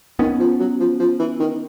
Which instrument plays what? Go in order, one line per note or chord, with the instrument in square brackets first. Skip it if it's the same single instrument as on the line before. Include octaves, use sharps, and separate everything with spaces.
[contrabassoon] D#3 [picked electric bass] B3 C#4
[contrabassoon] F3
F#3
F3
F3
E3
D#3